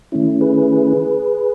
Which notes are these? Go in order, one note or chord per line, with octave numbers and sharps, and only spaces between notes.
D#3 A3 C#4 E4
G#4 B4